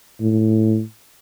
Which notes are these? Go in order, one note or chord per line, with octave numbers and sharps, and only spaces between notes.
A2